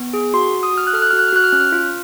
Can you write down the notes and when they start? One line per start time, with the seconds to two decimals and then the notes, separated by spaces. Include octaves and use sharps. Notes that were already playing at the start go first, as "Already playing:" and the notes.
Already playing: B3
0.13 G#4
0.34 F#4 C6
0.54 F#4
0.63 D#6
0.73 F#4 F6
0.87 F#6
0.93 A4 F6
1.02 F#6
1.11 F#4 F6
1.19 F#6
1.28 F6
1.33 F#4 F#6
1.44 F6
1.52 C#4 F#6
1.60 F6
1.72 F4